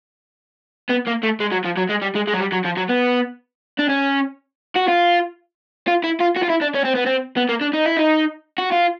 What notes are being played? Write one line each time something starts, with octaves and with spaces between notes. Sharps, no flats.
B3
A#3
A3
G#3
F#3
F3
F#3
G#3
G3
G#3
G#3
F#3
G3
F#3
F3
F#3
B3
D4
C#4
F#4
F4
F4
E4
F4
F#4
F4
E4
D4
C#4
C4
B3
C4
B3
A#3
D4
D#4
E4
D#4
F#4
F4